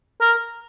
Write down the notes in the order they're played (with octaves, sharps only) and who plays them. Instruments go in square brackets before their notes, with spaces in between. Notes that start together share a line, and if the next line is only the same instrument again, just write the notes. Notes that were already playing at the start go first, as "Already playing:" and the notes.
[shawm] A#4